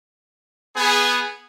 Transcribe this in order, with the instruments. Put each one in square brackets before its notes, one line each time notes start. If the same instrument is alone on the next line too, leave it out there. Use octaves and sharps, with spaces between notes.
[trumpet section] B3 G#4